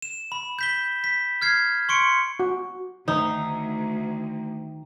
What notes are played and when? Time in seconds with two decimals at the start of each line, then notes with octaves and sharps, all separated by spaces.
0.02 E7
0.32 B5
0.59 G6 B6 G7
1.04 B6
1.42 F6 G#6 C7
1.89 C6 C#6 C#7 D7
2.40 F#4
3.08 D2 D#3 D#4 E5 A#5